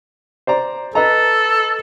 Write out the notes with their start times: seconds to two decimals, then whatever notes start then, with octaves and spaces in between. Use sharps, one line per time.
0.47 C5 D5 A#5
0.95 A4 B4 D#5 A#5